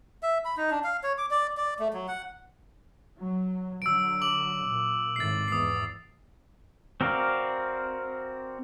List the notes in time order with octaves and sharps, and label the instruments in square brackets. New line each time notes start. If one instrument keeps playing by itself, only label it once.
[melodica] E5
B5
D#4
D4
F5
C#5
D6
D5
D5
A3
F#3
F#5
[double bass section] F#3
[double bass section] D3 F#3 [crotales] E6 D7
[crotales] D6 F#7
[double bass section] A#2
[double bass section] G#1 A2 [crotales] A6 C7
[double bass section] E2 G#2 [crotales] D#6 C7
[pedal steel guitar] C4 F#4 A#4 D5 F5